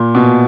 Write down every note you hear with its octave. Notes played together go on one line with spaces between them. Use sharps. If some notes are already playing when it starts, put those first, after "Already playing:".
Already playing: A#2
B2